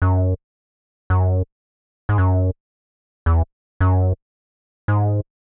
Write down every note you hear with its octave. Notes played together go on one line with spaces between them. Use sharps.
F#2
F#2
G#2
F#2
E2
F#2
G#2